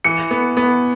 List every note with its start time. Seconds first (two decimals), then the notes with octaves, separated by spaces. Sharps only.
0.05 E3 C#7
0.31 B3
0.57 B3